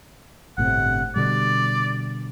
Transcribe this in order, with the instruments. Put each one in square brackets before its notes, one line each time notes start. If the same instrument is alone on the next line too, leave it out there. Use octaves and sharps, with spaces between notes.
[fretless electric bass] G1 A2 C3 [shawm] F#5
[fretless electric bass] B2 D3 G3 [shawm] D5